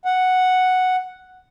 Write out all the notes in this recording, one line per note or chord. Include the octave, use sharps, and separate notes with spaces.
F#5